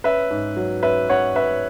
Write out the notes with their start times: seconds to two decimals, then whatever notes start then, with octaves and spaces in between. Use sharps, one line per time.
0.04 C#4 B4 E5
0.30 G#2
0.57 F#3
0.83 C#4 B4 E5
1.09 C#4 C#5 F#5
1.36 C#4 B4 E5